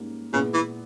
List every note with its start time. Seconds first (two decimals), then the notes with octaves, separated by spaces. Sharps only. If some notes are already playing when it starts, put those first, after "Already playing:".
Already playing: G#2 G3 A#3 C#4
0.33 A#2 C#3 G#3 B3 E4
0.54 E3